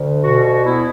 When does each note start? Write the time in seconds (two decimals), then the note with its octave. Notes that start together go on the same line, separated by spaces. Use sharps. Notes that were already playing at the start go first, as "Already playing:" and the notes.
Already playing: D2 D3
0.22 B2 F#4
0.43 F#4
0.64 B3 E4